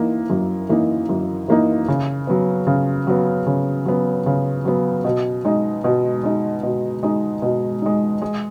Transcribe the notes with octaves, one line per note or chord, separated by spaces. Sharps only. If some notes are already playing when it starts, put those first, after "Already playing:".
Already playing: E3 A#3 D#4
F#2
E3 A#3 D#4
F#2
E3 A#3 D#4
C#3
F#3 B3
C#3
F#3 B3
C#3
F#3 B3
C#3
F#3 B3
B2
G#3 D#4
B2
G#3 D#4
B2
G#3 D#4
B2
G#3 D#4
G#3